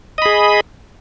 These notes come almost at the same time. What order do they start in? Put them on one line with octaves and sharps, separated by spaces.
D#5 B5 G#4